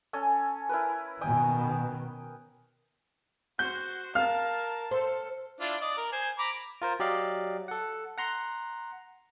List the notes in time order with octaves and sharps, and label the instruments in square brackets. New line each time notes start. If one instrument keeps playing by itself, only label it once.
[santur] C#4 A4 G#5
E4 A#4 B4
[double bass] B2 D#3 [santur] G5 G#5 D#6
[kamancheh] F#4 C5 [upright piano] G6
[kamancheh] A#4 A5 [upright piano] F5 F6
[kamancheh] A4 [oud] C5
[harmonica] D4 E4 F4
D5 D#5
A#4
C5 G#5
A#5 B5 D6
[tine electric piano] F4 A#4 C5
F#3 G4 D5 D#5 F5
A4 F#5
F#5 A#5 C6